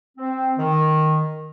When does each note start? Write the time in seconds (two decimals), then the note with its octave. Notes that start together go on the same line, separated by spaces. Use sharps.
0.17 C4
0.58 D#3